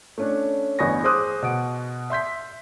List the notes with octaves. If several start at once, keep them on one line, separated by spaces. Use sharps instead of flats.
A3 C#4 D4
A1 G2 B3 G#5 C#6 A#6
G#4 C5 C6 D6 D#6 F#6
B2 F#5 D7
E5 C6 G6 B6